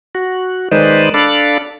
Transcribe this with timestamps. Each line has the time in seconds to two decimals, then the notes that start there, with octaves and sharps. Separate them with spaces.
0.15 F#4
0.72 D#3 G#3 D#4 B4 C5 D5
1.14 D4 A4 D5 F5 B5